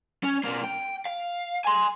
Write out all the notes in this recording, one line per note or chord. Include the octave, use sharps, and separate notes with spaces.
C#4
B2 A#3
G5
F5
G#5 C6